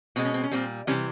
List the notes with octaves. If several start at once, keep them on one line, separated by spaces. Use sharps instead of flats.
B2 G#3 C4
C#4
C4
C#4
A#2 G3 C4
C3 E3 G3 C#4